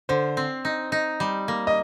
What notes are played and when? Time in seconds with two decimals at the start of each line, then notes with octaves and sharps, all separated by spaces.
0.09 D3 C5
0.37 C4
0.65 D#4
0.92 D#4
1.20 G3
1.48 A#3
1.67 D#5